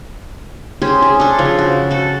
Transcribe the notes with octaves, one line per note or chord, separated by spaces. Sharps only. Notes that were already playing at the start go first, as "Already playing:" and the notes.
C#4 G4 G#4 C5
G#4
D4 A4
C#3 F3
F#4
F#4 A4